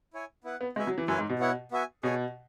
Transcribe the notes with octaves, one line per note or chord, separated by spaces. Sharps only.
E4 C#5 G#5
B3 E4 B4 F#5
B3
G#3 B3 F#4 E5 G#5
F#3
E3
F#2 C#4 E4 B4 G#5
G#2
B2
B3 E4 C#5 F#5
B3 F#4 E5 G#5
B2 G#4 C#5 G#5